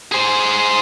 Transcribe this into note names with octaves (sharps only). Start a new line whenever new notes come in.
G#4 C5